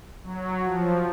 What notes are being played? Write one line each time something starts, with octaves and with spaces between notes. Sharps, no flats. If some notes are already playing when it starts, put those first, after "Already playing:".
F#3
F3